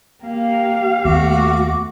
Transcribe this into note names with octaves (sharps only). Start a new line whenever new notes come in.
A#3 G4 F5
D#2 A3 B3 F#4 D6